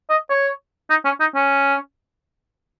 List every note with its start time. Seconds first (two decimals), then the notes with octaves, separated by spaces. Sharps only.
0.10 D#5
0.30 C#5
0.90 D#4
1.05 C#4
1.20 D#4
1.35 C#4